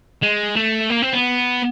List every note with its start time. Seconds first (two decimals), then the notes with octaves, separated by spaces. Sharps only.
0.22 G#3
0.56 A3
0.90 A#3
1.02 C4
1.13 B3